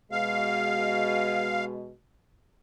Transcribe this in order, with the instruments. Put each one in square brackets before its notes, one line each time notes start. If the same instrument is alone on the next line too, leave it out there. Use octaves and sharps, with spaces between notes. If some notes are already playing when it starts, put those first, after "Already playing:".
[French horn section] B2 G#3 [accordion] F5